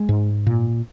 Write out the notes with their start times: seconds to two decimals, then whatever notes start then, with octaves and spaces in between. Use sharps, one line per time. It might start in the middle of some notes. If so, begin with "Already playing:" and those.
Already playing: G#3
0.09 G#2
0.46 A#2